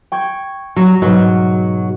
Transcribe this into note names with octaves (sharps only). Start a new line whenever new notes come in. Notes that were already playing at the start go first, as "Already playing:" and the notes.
G5 C#6 G#6
F#3
G#2 B2 F#3